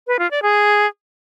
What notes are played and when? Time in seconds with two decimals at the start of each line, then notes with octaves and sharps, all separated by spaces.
0.07 B4
0.19 F4
0.31 D5
0.42 G#4